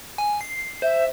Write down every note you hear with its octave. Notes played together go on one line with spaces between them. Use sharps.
G#5
C7
C5 E5